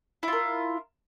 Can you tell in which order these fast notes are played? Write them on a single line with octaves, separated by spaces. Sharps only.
E4 F4 A#4